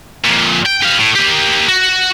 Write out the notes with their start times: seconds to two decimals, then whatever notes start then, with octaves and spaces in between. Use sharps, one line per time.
0.25 F2 A#2
0.66 G5
0.83 G4 F5
0.98 A2
1.15 A#3 G4
1.68 F#4